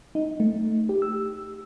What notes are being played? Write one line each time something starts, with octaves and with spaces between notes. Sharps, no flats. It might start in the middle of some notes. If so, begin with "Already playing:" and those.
D#4
A3
G4
E6